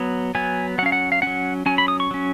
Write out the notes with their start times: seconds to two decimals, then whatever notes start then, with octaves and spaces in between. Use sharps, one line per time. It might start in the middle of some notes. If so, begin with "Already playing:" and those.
Already playing: F#3 B3
0.35 F#3 B3 G#5
0.78 F#3 F#5
0.83 C#4 F5
0.92 F#5
1.12 F5
1.22 F#3 C#4 F#5
1.66 F#3 C#4 G#5
1.78 B5
1.88 D#6
2.00 C#6
2.11 F#3 C#4